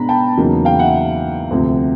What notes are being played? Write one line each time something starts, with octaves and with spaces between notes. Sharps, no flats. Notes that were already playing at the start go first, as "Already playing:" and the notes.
Already playing: B2 G#3 B3 D4 A#5 B5
G5 A5
E2 C#3 F#3 A#3 D#4
F5 G5
E5 F#5
D2 C3 F3